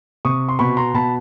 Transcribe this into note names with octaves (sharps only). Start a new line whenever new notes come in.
C3 C#6 D#6
C6
B2 B5 C#6
A#5 C6
B2 A5 B5